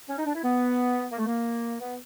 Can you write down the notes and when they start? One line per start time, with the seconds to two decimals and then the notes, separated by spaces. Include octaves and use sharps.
0.09 C#4
0.18 D#4
0.26 D4
0.35 E4
0.43 B3
1.12 A#3
1.18 A3
1.27 A#3
1.80 B3